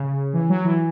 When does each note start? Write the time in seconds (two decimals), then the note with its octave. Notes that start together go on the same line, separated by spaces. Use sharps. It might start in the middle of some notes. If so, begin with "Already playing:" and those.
Already playing: C#3
0.33 E3
0.49 F#3
0.65 E3